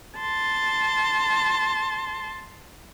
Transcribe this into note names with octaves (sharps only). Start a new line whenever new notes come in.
A5 C6